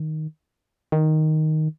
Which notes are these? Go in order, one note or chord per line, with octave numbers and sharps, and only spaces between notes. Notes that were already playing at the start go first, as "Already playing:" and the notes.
Already playing: D#3
D#3